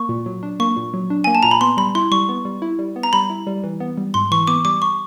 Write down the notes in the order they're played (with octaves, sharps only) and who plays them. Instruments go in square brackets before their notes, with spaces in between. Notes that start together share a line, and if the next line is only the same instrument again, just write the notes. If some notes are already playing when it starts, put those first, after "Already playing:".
Already playing: [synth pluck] A#3 [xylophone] C#6
[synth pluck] A#2
F#3
D4
[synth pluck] A#3 [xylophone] C#6
[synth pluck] A#2
F#3
D4
[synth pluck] A#3 [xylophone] G#5
[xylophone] A5
[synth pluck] A#2 [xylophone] A#5
[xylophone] B5
[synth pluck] B3 [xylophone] C6
[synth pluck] G3 [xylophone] B5
[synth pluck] E4 [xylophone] C6
[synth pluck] G3 [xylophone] C#6
[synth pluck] B3
G3
E4
G3
B3
[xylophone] A#5
[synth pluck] G3 [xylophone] B5
[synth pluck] E4
G3
E3
B3
G3
[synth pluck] G#2 [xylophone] C6
[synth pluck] E3 [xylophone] C#6
[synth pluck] B3 [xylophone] D6
[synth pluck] G3 [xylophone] D6
[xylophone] C#6